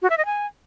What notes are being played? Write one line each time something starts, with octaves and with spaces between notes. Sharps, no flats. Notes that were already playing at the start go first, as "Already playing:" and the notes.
F#4
E5
D#5
G#5